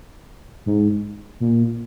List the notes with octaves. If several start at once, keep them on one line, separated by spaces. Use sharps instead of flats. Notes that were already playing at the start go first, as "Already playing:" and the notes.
G#2
A#2